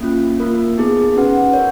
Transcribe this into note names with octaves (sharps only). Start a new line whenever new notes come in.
A#3 C#4 F4
A#3 F4 A#4
B3 D#4 G#4
C#4 F#4 B4 F#5
A#4 C#5